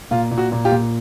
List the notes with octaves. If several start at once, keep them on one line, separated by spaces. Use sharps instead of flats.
A#2 F4
A#2
F#4
A#2
F4 G4
A#2